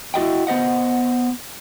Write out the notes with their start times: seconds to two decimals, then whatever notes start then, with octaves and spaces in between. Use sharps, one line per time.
0.14 E4 F#4 D#5 G5
0.47 B3 C5 D#5 F#5